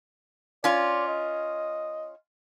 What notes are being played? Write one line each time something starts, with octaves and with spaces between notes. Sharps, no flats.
C#4 F4 D5
D#5